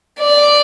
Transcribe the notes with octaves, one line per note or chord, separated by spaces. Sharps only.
D5